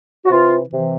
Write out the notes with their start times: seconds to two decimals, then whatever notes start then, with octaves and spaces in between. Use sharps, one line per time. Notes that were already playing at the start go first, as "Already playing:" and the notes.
0.25 F#4
0.30 C3 E3 F4
0.70 C3 E3